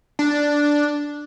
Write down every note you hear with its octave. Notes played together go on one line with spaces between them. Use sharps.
D4